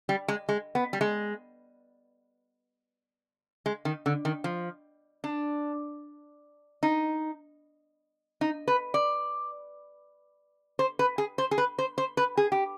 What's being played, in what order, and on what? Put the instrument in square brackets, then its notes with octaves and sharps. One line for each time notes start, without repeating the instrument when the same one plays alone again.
[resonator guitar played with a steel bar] G3
G#3
G#3
B3
G3
G#3
G#3
D#3
D3
D#3
F3
D4
D#4
D#4
B4
D5
C5
B4
G#4
C5
G#4
B4
C5
C5
B4
G#4
G4